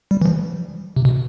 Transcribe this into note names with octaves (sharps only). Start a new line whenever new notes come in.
G3
E3
F3
C3
B2